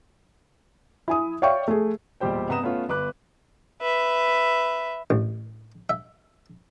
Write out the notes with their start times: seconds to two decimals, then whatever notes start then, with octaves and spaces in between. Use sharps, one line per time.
1.08 E4 G#5 D#6
1.42 C#5 D5 E5 F5 G5 C#6
1.68 A3 G#4
2.20 E1 A#2 G3 G4 C5 G5
2.48 G2 C3 B3 A#5 D#6 E7
2.63 A3 B3 C#4 F4
2.89 G1 B4 D6 F#6
3.82 B4 E5
5.10 A1
5.90 E5